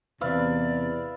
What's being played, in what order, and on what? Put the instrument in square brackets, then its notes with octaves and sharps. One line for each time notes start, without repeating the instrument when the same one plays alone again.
[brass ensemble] E2 [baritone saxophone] C3 [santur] B4 E5 F5 [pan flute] D5